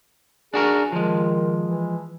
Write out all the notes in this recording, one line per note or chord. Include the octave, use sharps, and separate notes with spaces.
D4 F#4 G#4 A#4
D#3 F3 G#3
E3